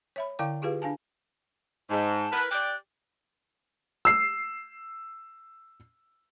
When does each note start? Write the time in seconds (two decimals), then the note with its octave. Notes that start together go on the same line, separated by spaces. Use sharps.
0.16 C#5 E5 B5
0.39 D3 E4 D5 F5 G5 D6
0.62 E4 F4 G4 G#4 B4 F5
0.82 D4 F5 G#5 A5
1.90 G#2 A5
2.32 E4 A#4 B4
2.51 G4 D5 F#6
4.05 E6 C7